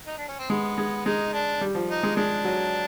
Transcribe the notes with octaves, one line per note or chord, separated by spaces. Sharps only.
D#4
D4
C#4
C4
G#3 B3
G#3
G#3 D#4
D4
G3
F3
D#4
G#3
G#3 D4
F#3